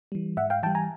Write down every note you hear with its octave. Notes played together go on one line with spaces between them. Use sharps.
E3 G3
G#2 E5 F#5
F5 G5
E3 G3 G5 A5
G#5 A#5